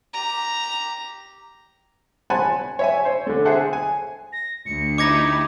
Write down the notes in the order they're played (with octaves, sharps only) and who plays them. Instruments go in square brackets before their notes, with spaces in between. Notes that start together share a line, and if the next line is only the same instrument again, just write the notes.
[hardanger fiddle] G4 A#5
[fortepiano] F#5 G#5 A5 B5 C6
C#5 E5 G#5
C5 C#5
D3 A3
G#4 C5 E5 F#5 A5
G#5
[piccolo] A#6
[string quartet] D2 [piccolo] C#7
[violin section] D#4 E4 G4 [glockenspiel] D6 G#6 A#6